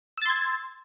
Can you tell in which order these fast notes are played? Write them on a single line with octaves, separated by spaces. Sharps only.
E6 A6 C6 G#6